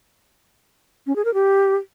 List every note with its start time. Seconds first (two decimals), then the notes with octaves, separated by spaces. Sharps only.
1.07 C#4
1.16 G#4
1.25 A#4
1.34 G4